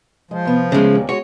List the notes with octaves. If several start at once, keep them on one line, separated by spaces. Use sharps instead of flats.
F3 G#3
C3 B3
C#3 G#3 A3 E5
D#2 A#2
G#3 F#4 C#5